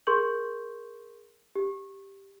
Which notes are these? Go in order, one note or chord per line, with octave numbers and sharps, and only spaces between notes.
G#4 A#4 C6 C#6 G6 F#7
G4